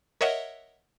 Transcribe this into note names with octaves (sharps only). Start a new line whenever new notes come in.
A#4 C#5 D#5 E5 F#5